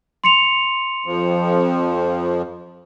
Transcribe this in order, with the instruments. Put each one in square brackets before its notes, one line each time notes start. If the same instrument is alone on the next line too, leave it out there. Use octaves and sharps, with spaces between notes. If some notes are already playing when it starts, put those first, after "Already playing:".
[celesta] C6 C#7 F7
[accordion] F2 F3